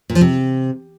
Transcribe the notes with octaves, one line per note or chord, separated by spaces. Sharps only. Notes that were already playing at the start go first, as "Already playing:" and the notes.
A#2
F3
C3